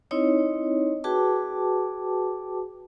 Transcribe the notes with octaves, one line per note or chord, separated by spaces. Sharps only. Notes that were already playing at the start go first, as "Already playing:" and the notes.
C4 D#4 E4 C#5 D#5
F#4 G#4 B4 G5 A5 D6